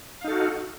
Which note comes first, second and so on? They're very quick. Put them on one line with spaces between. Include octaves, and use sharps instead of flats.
F5 D#4 A4 F#4